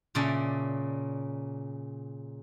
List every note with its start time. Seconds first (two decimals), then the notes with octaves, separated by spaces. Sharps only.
0.15 A#2 C#3 C#4 D5 E5 A5